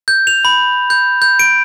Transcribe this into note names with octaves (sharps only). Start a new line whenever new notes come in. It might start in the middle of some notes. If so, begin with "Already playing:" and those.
G6
F7
B5
G6
G6
D7